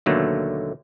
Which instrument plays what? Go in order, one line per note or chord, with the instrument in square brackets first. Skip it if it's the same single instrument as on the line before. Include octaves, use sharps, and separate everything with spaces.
[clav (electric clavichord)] D#2 B2 D3 F#3 A3 A#3